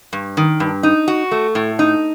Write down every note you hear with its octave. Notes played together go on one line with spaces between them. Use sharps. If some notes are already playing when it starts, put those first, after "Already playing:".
G2
D#3
G2
D#4
F#4
A3
A2
D#4